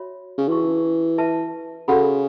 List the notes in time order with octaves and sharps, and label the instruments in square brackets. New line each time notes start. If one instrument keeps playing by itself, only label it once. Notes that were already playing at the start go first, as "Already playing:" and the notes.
Already playing: [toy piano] F#4 C#5 E5 B5
[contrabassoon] C#3
[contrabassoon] E3 [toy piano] C#4 F#4 B4 A5 C#6
[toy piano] B4 E5 A5
[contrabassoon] C#3 [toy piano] F#4 A4 F#5 B5